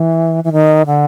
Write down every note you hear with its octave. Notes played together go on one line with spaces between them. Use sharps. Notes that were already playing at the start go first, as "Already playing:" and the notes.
Already playing: E3
E3
D#3
D3